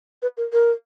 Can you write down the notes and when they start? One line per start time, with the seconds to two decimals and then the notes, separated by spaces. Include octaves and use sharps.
0.22 B4
0.37 A#4
0.53 A#4